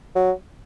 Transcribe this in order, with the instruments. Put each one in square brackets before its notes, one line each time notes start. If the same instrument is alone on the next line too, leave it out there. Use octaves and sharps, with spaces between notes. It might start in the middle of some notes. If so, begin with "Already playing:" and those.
[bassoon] F#3